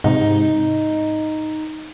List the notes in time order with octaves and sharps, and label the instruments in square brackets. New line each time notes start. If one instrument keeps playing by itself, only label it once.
[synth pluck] G#2 C3 [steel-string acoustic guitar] D#4